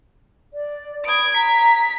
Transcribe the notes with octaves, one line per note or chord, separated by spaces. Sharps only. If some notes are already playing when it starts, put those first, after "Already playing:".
D5
B5 D#6 G#6 D7
A#5 B6